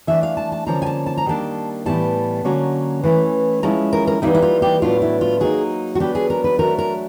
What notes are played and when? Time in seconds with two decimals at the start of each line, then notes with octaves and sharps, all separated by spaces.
0.07 E3 A3 D4 E5
0.23 F5
0.37 A5
0.52 A5
0.67 D3 F3 A#3 C#4 A#5
0.82 G#5
0.86 A5
1.06 A5
1.17 A#5
1.26 D#3 G3 A#3 D4 A5
1.86 A2 E3 G3 B3 A5
2.44 D3 F#3 A#3 C#4
3.03 E3 A3 C#4
3.63 F3 G#3 C#4 E4 A#5
3.93 A#4
4.07 A#4
4.22 E3 G3 A#3 D#4 E4
4.35 E4
4.42 F4
4.62 G4
4.82 A2 F#3 B3 D4 F4
5.02 E4
5.21 F4
5.40 F#3 A#3 D#4 G#4
5.95 F#4
6.00 F#3 B3 D4 G4
6.15 G#4
6.30 A#4
6.44 B4
6.59 F#3 A3 D4 A#4
6.78 A#4